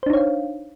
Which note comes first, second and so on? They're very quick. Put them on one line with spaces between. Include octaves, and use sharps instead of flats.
C5 D4 D#4 C#5 F5